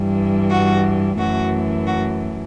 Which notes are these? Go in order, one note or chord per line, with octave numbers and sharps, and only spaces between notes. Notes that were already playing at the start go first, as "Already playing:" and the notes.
Already playing: G2 E3 G3
F#4
F#2 E3 A3 F#4
F#4